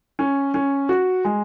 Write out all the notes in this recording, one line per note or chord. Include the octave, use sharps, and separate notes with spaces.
C#4
C#4
F#4
G#3